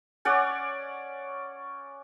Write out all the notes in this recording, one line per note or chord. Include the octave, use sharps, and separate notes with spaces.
C#4 C#5 D5 F#5